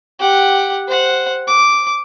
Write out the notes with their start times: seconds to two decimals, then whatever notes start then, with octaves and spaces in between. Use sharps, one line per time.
0.19 G4 F#5
0.88 C5 F#5
1.47 D6